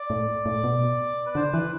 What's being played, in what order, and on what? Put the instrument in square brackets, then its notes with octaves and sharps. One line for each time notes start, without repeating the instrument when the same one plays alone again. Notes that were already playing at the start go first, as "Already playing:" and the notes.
Already playing: [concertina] D5
[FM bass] A2
A2
B2
[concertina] B4
[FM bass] D3 [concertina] C5
[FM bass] E3 [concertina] B4